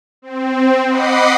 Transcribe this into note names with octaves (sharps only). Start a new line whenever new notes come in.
C4
D#5 F#5 B5 D6 C7